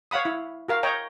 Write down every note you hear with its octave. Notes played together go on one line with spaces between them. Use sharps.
C#5 F5 F#5 B5 D#6
E4
F#4 A#4 F5
C#5 D#5 G5 A#5